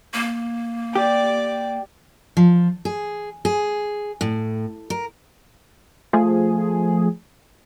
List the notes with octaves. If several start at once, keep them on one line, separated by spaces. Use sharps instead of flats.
A#3
G4 D5 D6
F3
G#4
G#4
A2
A#4
F3 A3 G#4